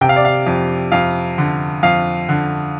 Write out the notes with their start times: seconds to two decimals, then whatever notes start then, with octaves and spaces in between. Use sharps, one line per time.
0.01 C3 G5
0.09 F5
0.16 D5
0.25 F5
0.47 F2
0.92 F2 F5
1.38 D3
1.83 F2 F5
2.29 D3